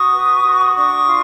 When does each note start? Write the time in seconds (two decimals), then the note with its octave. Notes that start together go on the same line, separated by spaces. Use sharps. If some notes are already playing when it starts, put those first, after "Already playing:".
Already playing: F#4 C#6 D#6
0.11 B4
0.43 F#4
0.74 D4 C#6 D#6
1.05 F4